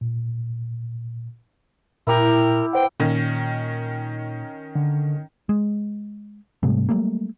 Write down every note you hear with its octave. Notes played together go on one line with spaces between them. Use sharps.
A#2
A#2 E4 G4 A#4
B4 C5 F#5 G5
A#2 D#3 C#4
D3
G#3
G#2 C3 G3 A3
F#3 G3 A3 A#3